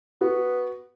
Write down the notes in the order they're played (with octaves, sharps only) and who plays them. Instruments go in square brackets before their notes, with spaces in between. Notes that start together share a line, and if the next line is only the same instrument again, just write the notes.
[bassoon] B3 [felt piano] F#4